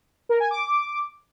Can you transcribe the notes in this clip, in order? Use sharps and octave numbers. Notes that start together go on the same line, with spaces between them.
A#4
G#5
D6